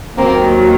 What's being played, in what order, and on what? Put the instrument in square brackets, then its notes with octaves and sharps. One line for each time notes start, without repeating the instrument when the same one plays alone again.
[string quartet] D#2 D#3 F#3 A#3 C4